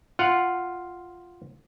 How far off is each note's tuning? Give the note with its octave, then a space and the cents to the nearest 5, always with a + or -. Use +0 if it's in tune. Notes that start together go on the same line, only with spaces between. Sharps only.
F4 +0 F#5 +0